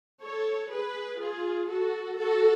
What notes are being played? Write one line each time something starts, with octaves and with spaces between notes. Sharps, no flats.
A4 C#5
G#4 B4
F4 G#4
F#4 A4
F#4 A4